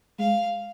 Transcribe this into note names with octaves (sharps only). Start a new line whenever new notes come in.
G#3 F5